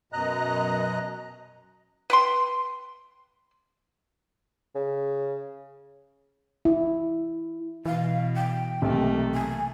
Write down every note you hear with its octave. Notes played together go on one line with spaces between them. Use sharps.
F#2 B2 D#5 A#5 F#6
B4 G5 C6
C#3
E4
B2 E3 F5
G5
B1 C3 A3 A#3 G4
G#5